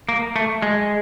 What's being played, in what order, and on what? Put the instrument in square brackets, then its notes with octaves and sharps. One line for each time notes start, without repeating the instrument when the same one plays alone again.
[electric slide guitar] A#3
A3
G#3